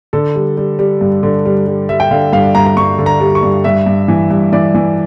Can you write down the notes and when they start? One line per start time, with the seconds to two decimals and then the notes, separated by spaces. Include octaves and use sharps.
0.13 D3 A4
0.35 G3
0.57 G3
0.79 G3
1.01 G2
1.23 D3
1.45 G3
1.67 G3
1.89 G3 E5
2.00 G5
2.11 D3 F5
2.33 G2 F5
2.55 G2 A#5
2.66 A#5
2.77 G2 C#6
2.99 D3
3.06 A#5
3.20 G3
3.35 C#6
3.43 G2
3.64 G2 E5
3.86 G2
4.08 E3
4.31 G2
4.53 E3 D5
4.75 E3